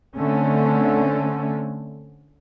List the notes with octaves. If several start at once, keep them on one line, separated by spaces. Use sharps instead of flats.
D3 A3 C4 C#4